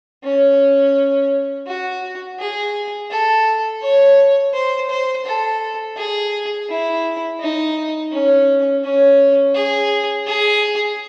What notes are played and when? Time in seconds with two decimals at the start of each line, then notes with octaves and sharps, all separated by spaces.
0.24 C#4
1.67 F#4
2.39 G#4
3.11 A4
3.82 C#5
4.54 C5
4.90 C5
5.26 A4
5.96 G#4
6.69 E4
7.40 D#4
8.12 C#4
8.84 C#4
9.55 G#4
10.27 G#4